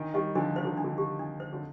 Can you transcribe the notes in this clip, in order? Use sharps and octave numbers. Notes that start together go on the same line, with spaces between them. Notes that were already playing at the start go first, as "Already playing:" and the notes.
Already playing: D#3 D4
D#3 G3 G4
D3 F3 D4
D#3 C5
D3
D4
D3
G4
D4
C5
D3